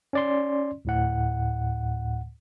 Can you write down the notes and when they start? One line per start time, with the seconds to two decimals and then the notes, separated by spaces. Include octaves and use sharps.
0.13 C#4 D5 C6
0.85 D2 A2 F#5